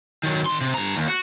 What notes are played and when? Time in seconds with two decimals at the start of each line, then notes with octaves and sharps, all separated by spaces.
0.23 D#3 F#3
0.46 D#3 C6
0.61 C3
0.74 G2 A#5
0.96 D#2
1.08 F#4